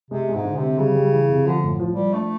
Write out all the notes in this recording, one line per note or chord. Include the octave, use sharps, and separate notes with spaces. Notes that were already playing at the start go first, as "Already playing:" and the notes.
C3 G#3
G#3
G#2
D3
C3 C4
C#3 G3
G3
E3
C3
D3 F3
A2
F3
G3
F3
A3 D4